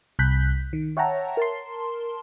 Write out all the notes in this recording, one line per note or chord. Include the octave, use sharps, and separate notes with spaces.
C2 F#6 G6 B6
D#3
C#5 E5 F#5 G5 A5 A#5
A#4 A5 C6